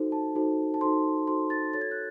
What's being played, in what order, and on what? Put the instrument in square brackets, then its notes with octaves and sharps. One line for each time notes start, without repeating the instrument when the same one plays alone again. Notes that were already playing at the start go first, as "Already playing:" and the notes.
Already playing: [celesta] D#4 F#4 A4 C5
A5
D#4 F#4 A4 C5
A5
D#4 F#4 A4 C5 C6
D#4 F#4 A4 C5 C6
A6
F#4 A4 C#5 A6
G#6
F#6